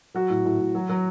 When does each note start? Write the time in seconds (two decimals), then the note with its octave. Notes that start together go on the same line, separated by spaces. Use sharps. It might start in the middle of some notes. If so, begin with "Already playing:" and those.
0.14 F#3 F#4
0.30 A2
0.45 A2
0.59 A2
0.75 F#3
0.89 F#3